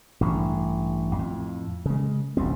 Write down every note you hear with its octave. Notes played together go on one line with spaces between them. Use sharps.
A1 G2 D3
F2 A2
C#3 G#3
D#1 C2 G3 C4